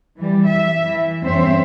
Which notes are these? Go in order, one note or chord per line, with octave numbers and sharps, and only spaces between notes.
E3 G3
E5
E3
E2 G2 C4 C#4 C5 E5